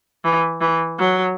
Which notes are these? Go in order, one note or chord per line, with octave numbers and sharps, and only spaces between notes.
E3
E3
F#3